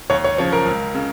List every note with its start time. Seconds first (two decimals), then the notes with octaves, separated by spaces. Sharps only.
0.10 D#2 C#5
0.24 C#5
0.38 C#3 F3 C#5
0.52 A#4
0.66 C#2
0.95 C#3